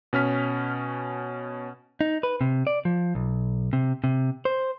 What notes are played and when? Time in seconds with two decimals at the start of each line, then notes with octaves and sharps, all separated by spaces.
0.13 B2 C#4 F6 B6
2.01 D#4
2.23 B4
2.41 C3
2.67 D5
2.85 F3
3.15 B1
3.73 C3
4.04 C3
4.45 C5